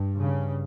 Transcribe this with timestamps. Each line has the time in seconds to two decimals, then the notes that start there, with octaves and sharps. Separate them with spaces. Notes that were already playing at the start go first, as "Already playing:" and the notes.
Already playing: G2
0.17 C#3